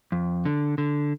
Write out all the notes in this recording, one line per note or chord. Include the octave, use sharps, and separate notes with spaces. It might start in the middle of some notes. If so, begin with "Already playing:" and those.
F2
D3
D3